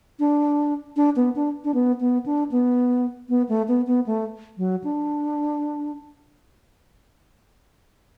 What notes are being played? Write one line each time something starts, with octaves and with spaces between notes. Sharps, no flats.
D4
D4
B3
D4
D4
B3
B3
D4
B3
B3
A3
B3
B3
A3
F#3
D4